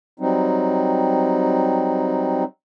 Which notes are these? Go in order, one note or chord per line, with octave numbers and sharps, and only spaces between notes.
F#3 G3 C4 D#4